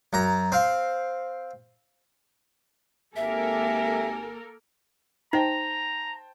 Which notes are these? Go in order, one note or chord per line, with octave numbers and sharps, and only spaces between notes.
F#2 A#5
C4 F5
G#1 A#3 G4 A4 A#4 E5 G#5
D#4 C5 G5 A5 A#5